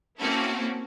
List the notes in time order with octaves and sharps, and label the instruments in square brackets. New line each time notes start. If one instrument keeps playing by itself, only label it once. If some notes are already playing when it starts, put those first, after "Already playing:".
[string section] A#3 C4 C#4 E4 F#4 A4